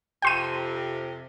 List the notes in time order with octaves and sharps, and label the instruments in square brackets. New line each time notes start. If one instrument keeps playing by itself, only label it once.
[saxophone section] F2 C3 [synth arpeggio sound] G5 C6 D#7